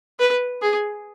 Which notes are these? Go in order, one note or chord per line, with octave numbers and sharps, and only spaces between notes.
B4
G#4